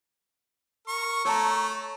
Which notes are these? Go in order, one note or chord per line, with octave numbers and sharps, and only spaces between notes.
A#4 C#6
A3 C#5 A5 A#5